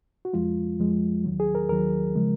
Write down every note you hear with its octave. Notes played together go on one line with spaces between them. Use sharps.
F#4
F2 F3 G#3 F4
F2 F3 G#3
D#2 D#3 F#3
G#4
A#4
D#2 D#3 F#3 A#4
C#3 F3 G#3